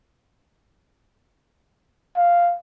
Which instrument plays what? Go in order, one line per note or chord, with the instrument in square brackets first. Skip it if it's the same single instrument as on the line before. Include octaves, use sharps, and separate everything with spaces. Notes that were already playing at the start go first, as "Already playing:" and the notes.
[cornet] F5